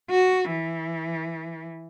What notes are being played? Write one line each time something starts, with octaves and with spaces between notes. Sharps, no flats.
F#4
E3